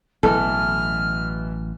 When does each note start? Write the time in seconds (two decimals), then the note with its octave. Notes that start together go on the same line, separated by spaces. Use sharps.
0.23 A1 B2 E3 F#3 A4 F6